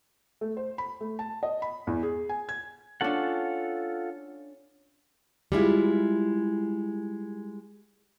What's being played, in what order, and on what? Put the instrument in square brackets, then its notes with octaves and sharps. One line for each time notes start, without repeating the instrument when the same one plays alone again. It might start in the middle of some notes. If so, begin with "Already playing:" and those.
[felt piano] A3
C5
B5
A3
A5
D#5
B5
E2
G#4
G#5
G#6
[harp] C#4 D4 [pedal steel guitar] F4 A4 F#5
[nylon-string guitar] G3 G#3 E4 F4